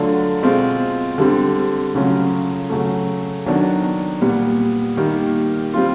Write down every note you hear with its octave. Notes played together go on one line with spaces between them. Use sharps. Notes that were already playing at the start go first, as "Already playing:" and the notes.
Already playing: D3 F#3 A3 D4 F4
B2 G#3 C4 F4
D3 G3 C4
C#3 F#3 A3 C#4 F4
C#3 F#3 A3
D#3 F#3 B3 D4
A#2 G3 B3
D#3 G3 A#3
G3 C4 F4